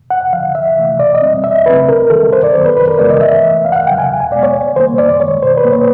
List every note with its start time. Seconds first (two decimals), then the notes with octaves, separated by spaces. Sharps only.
0.10 F2 F#5
0.33 D3 F3 F5
0.55 C#2 E5
0.77 C3 E3 A3
0.99 B2 D5
1.15 D#5
1.22 G3 C4
1.44 E2 E5
1.66 C#3 F#3 A3 C4 B4
1.88 D#2 A#4
2.10 D#3 G3 A4
2.33 G2 C5
2.44 D5
2.55 D#3 F#3 B3 C5
2.66 B4
2.76 F#2 B4
2.88 A#4
2.99 C#3 E3 G#3 B3 D5
3.10 D#5
3.21 G2 E5
3.43 E3 A3
3.65 E2 F5
3.72 F#5
3.76 F5
3.87 C#3 F#3 G5
3.99 G#5
4.09 E2
4.20 G#5
4.32 B2 G#3 B3 D5
4.43 C#5
4.54 D#2
4.76 D#3 G3 A#3 C5
4.98 F#2 D5
5.20 D#3 G#3 C#5
5.42 B2 C5
5.57 B4
5.65 F#3 A#3
5.72 C#5